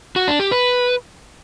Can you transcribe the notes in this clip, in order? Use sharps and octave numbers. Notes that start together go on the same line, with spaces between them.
F#4
D4
G4
B4